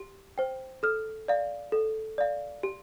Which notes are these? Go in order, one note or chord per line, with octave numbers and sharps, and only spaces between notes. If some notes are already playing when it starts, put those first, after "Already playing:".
Already playing: G4
C5 G5
A4 F6
D5 F5
A4
D5 F5
G4